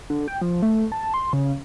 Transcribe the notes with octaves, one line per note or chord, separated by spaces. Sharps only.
D3
G5
F3
A3
A5
C6
C#3